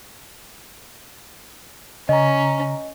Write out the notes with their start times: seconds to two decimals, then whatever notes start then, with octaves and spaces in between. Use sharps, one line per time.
2.09 C#3 C#4 D#5 A#5